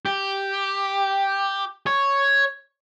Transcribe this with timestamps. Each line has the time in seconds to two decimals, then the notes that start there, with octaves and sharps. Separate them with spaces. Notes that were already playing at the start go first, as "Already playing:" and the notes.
0.06 G4
1.87 C#5